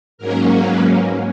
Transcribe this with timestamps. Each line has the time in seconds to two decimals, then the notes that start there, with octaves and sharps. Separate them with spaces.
0.18 G#2 F#3 A#3 C#4 A#4
0.66 B4